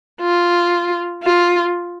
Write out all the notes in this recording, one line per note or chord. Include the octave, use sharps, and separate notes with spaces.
F4
F4